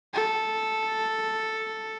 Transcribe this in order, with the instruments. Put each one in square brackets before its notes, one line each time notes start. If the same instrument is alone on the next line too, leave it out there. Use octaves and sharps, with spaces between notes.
[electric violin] A4